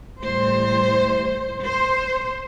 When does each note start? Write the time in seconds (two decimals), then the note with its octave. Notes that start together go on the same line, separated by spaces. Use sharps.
0.22 A2 E3 G3 C5
1.65 C5